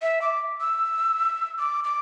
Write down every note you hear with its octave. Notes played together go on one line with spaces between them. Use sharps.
E5
D6
E6
D6
D6